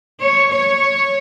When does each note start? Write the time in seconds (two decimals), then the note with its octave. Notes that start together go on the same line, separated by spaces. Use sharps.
0.20 C#5
0.50 C#5